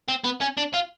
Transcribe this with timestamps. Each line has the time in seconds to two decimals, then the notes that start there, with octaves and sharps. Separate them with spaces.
0.08 C4
0.24 B3
0.41 C#4
0.57 D4
0.74 F4